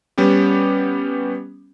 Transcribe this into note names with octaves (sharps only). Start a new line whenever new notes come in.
G3 B3 C#4 G4